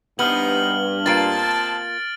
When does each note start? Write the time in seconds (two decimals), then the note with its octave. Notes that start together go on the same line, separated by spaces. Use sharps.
0.19 G2 C3 E3 B3 D#4 F6 F#7
1.06 C3 A#3 F4 D#5 A5 A6 D7